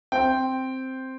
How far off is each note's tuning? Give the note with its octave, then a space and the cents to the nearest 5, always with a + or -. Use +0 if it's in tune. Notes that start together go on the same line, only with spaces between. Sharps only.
C4 +0 G5 +0